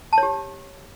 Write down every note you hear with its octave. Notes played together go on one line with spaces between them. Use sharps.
A5
C#5
G4